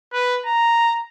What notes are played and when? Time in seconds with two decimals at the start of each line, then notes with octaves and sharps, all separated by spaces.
0.13 B4
0.46 A#5